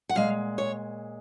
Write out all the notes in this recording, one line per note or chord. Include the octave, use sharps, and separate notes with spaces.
F#5
A#2 G#3 F5
C#5